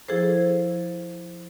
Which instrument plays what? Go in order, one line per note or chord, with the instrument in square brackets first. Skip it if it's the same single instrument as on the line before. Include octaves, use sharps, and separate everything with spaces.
[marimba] F3 E4 G#4 A4 C5